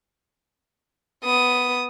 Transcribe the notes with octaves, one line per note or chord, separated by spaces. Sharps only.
B3 D#6